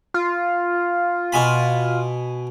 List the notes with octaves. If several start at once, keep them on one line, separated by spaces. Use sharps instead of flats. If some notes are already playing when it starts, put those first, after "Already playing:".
F4
B2 G#5 B5